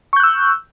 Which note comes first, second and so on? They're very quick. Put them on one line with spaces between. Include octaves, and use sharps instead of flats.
C#6 G6 F#6 E6